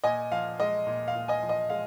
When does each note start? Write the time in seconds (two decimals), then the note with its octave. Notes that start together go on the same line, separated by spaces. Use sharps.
0.04 A#2 D#5 G#5
0.32 F3 F5
0.60 G#3 D#5
0.87 A#2
1.08 F5
1.15 A#2
1.28 D#5 G#5
1.43 F3
1.49 D#5
1.70 G#3 F5